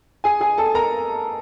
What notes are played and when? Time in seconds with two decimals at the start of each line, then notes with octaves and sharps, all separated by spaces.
0.24 G#4 G#5
0.41 G#4 G#5
0.58 A4 A5
0.75 A#4 A#5